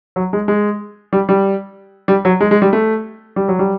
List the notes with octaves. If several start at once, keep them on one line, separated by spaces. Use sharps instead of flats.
F#3
G#3
G#3
G3
G3
G3
F#3
G#3
G#3
G3
A3
G3
F#3
G3